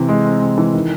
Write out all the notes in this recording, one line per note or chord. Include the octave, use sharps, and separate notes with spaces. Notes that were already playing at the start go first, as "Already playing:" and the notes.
Already playing: C3 E3
G#3
C4
C3
E3
D#3